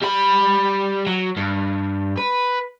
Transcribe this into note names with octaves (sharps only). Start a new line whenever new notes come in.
G3 B5
F#3
G2
B4